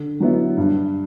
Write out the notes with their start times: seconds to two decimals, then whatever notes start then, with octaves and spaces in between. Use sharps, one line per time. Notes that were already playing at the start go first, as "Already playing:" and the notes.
Already playing: D3
0.20 F#3 B3 E4
0.57 G2